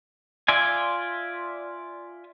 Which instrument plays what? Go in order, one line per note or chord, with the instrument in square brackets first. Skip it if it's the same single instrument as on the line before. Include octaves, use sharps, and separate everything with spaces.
[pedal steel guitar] F4 D5 E5 G#5